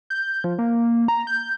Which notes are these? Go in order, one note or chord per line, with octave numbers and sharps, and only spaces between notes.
G6
F3
A#3
A#5
G6